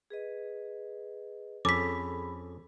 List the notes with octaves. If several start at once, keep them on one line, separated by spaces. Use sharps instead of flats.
G#4 B4 D#5
F2 C#4 G#4 A4 B5 D6 B6